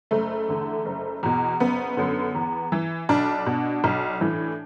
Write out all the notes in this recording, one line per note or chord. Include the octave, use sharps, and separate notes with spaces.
F#1 A3
E2 D3
F#1
E2 B2
F#1 B3
F#2 D3
E2
E3
B1 D4
B2
B1
A2 E3